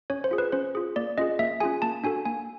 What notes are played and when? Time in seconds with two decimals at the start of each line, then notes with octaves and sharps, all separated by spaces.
0.10 C#4 C#5
0.24 C5
0.31 F4 G#4
0.38 B4
0.52 C#4 C5
0.75 F4 G#4
0.96 A#3 D5
1.18 C#4 F4 G#4 D#5
1.39 A#3 E5
1.60 C#4 F4 G#4 G#5
1.82 A#3 A5
2.04 D4 F#4 A4 G#5
2.25 A#3 G#5